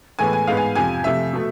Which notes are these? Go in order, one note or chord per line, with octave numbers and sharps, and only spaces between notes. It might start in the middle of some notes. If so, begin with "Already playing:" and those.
A2 E3 G#3 B3 G#5
G#5
G#2 G#3 B3 F5
G#5
F2 C3 F3 G#5
C3 F3 A3 E5
B2 A3